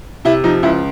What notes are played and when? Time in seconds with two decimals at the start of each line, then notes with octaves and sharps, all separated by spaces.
0.25 C3 E4
0.44 F3 D#4
0.63 C#2 E4